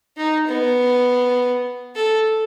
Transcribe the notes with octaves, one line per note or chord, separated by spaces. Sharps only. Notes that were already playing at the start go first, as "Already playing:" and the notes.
D#4
B3
A4